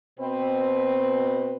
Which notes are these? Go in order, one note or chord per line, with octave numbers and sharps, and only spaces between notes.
B2 C4 B4